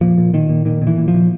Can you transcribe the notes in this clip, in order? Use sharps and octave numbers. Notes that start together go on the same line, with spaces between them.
A#2 F3
A#2
A#2 D#3
A#2
A#2 D#3
A#2
E3
A#2
F3
A#2